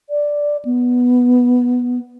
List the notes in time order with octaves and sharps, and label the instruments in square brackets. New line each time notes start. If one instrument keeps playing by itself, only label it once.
[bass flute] D5
B3